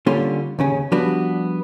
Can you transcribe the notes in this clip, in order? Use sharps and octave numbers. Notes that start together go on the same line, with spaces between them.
D3 G3 A#3 C#4 F4 C6
D#2 C#3 C#4
F3 G3 B3 D4 F#4